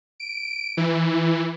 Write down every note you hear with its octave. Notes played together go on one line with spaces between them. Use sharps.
D7
E3